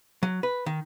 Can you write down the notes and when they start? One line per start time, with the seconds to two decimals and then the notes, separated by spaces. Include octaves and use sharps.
0.23 F#3
0.43 B4
0.66 D#3